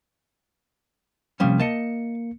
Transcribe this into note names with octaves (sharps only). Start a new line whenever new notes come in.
C3 F3 G3 A#3 C#4
A#3 D#5 A5 C#7